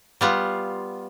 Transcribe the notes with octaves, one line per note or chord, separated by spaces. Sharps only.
G3 B3 F4